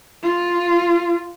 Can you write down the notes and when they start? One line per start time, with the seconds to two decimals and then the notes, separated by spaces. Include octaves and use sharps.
0.23 F4